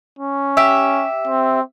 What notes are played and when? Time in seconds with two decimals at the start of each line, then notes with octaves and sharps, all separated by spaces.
0.19 C#4
0.57 G4 E5
1.28 C4